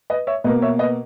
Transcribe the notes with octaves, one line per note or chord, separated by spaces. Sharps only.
B4 D#5
C#5 E5
B2 A#3 B4 D#5
C#5 E5
B4 D#5